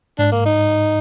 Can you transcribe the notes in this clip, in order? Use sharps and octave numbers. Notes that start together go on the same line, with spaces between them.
G#2 D4
A#3
D#4